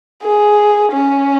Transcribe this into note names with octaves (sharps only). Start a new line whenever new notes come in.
G#4
C#4